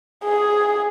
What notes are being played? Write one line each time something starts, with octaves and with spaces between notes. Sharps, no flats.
G#4